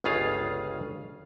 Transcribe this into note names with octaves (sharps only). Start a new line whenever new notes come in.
G1 C#2 C#3 F4 G#4 F5